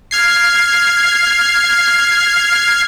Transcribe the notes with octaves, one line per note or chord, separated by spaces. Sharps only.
F6 G#6 C7